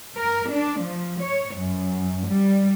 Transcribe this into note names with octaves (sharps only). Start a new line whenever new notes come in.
A#4
D4
F3
C#5
F#2
G3